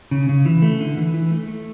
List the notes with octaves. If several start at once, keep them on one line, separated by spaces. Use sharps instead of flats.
C#3
C#3
E3
A3
D3
E3
E3
A3
A3